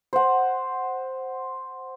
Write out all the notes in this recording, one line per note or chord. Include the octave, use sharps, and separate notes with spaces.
C5 F#5